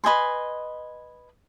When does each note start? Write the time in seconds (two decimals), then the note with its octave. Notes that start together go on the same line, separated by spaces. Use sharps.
0.04 B4 D#5 G#5 C6